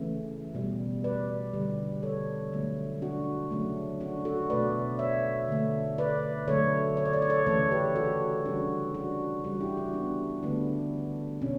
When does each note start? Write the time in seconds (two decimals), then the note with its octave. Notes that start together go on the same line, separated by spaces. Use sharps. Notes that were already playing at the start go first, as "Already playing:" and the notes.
Already playing: C#3 E3 A3
0.55 B2 G3
1.04 B4 D5
1.53 D3 G3
2.03 A4 C#5
2.52 D3 F#3 A3
3.02 D4 F#4
3.51 C#3 F#3 A3
4.01 D4 F#4
4.25 F#4 A4
4.50 B2 A3 B4 D5
4.99 C#5 E5
5.48 D3 A3
5.98 B4 D5
6.48 D3 F#3 A3 A4 C#5
6.97 C#5
7.05 D5
7.13 C#5
7.22 D5
7.30 A4 C#5
7.47 C#3 E3 A3 A4 C#5
7.71 G4 B4
7.96 F#4 A4
8.45 C#3 E3 G3 D4 F#4
8.94 D4 F#4
9.44 C#3 E3 G3 D4 F#4
9.61 E4 G4
9.77 D4 F#4
9.93 B3 D4
10.43 D3 A3 B3 D4
11.42 B2 C#4